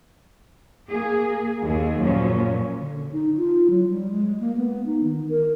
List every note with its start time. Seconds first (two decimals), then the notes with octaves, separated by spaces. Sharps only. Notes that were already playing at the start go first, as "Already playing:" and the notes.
0.87 A#3 G#4
1.62 D#2 G#4
2.00 F#2 A#2 F3 C#4
2.80 D3
3.12 D#4
3.37 F4
3.70 F#3
3.91 G3
4.10 G#3
4.40 A#3
4.57 B3
4.86 D#4
5.04 D#3
5.29 A#4